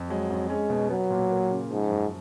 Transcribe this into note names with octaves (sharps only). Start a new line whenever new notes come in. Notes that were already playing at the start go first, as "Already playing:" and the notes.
Already playing: F2
F#3 G#3
F2
G#3 C#4
B2
F#3 B3
A#2
A#3
C#3
G#2 F3
F#2